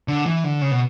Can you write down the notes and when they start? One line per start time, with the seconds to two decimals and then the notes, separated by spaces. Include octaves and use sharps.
0.08 D3
0.26 E3
0.44 D3
0.62 C#3
0.71 B2